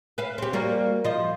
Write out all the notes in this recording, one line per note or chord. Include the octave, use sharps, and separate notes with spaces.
B4 E5 F5
C4 G4
G3 A#3 F#4
F3 D#5